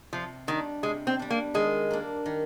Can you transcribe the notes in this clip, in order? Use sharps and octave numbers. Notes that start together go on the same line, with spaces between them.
C3 F3
D#3 G3 D4
C3 G#3
C4
G3 D4
A#3
D#3 G#3
A#3 D4
D#3